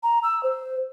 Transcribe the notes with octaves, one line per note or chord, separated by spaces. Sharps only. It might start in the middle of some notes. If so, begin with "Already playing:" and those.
A#5
E6
C5